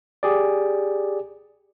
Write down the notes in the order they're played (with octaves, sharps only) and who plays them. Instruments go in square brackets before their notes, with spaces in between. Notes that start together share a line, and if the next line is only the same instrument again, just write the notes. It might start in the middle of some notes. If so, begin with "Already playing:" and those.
[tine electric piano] G4 G#4 D5